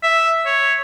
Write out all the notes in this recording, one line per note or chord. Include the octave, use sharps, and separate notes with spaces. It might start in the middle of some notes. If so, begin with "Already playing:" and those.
E5
C#5